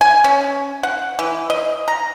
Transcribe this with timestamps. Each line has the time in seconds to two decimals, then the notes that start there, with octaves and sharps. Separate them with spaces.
0.01 G#5
0.24 C#4
0.83 F#5
1.19 E3
1.50 D#5
1.88 A#5